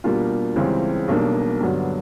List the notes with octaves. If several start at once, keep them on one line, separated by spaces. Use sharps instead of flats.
B2 G3 A#3 D4 F4
C#2 C#3 E3 G3 C4
B1 B2 G3 A#3 D4
G2 D3 F#3 B3